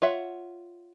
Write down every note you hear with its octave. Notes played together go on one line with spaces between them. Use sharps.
F4 C#5 E5 F#5